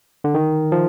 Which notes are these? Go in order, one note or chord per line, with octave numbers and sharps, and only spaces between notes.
D3
D#3
F3